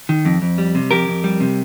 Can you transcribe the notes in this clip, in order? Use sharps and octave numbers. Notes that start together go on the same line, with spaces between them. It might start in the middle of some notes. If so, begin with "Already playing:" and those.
D#3
F2
F2
G3
C3
F2 G4 A#4
F2
G3
C3